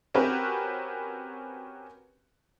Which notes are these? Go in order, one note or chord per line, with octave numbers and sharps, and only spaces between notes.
C4 C#4 F#4 G4 A#4 B4